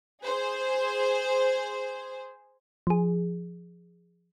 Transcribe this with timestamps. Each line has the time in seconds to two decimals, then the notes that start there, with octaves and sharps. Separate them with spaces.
0.22 G#4 C5
2.87 F3 G#4